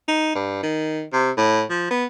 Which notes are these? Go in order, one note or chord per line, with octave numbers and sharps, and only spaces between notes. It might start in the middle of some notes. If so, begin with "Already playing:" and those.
D#4
G2
D#3
C3
A2
F3
B3